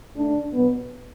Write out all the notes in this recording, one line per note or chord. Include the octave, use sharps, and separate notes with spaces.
D3 A3 D4
B2 F#3 B3